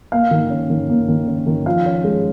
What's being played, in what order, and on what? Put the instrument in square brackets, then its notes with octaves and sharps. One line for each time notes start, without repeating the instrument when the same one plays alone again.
[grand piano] A#3 F5
D#3
C#4
D#3
A#3
D#3
C#4
D#3
F3 F5
C#4
G#3